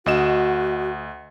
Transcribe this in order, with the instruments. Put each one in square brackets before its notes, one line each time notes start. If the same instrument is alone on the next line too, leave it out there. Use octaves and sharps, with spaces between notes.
[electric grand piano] D2 D#5 E7 [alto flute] F#4